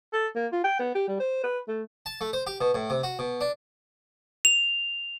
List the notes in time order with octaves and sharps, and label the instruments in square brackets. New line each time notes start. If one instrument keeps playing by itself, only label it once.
[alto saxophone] A4
A#3
F4
G5
B3
G4
G3
C5
B4
A3
[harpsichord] A5
A3
C5
G4
B2
A2
C3
F#4
B2
D4
[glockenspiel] F7